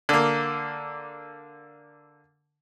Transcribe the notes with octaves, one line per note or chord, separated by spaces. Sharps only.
D3 A#3